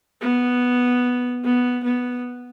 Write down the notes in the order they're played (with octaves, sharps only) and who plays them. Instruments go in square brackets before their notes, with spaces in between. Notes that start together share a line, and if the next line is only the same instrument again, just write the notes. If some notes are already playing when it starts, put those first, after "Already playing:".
[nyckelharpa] B3
B3
B3